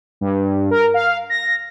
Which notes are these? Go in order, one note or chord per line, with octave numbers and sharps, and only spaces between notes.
G2
A#4
F5
A#6